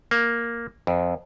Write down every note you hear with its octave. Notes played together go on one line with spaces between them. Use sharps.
A#3
F2